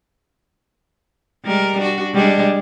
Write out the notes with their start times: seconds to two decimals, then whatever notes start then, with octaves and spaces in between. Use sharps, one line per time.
1.45 G3 G#3 A#4
1.78 D4 F#4
2.14 G3 G#3 D4